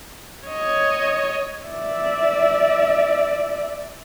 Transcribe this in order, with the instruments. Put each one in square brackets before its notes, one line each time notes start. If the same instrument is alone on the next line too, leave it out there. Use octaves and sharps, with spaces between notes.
[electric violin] C#5 D#5
[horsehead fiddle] D5 E5